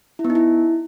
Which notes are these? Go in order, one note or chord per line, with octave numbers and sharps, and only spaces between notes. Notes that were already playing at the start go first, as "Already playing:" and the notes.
E4
B3
D#4
E4